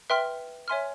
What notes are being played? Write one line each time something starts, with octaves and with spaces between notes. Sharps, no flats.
B4 E5 G5 C6 F6
C#5 E5 G#5 C6 F6